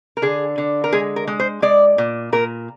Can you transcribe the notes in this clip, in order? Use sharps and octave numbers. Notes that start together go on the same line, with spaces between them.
A#4
D3 G#4
D3
A#4
G#3 G#4
A#4
G#3
C5
G#3 D5
A#2
A#2 A#4